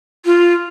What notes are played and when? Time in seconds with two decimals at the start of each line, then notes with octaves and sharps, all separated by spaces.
0.25 F4